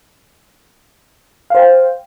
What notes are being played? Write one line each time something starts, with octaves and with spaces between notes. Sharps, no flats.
C5 F5 G5